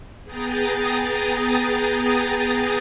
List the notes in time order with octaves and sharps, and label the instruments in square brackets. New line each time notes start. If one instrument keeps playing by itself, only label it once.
[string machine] B3 G#4 G5 A#5 D#6 A6